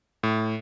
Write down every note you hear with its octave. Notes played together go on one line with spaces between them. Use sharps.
A2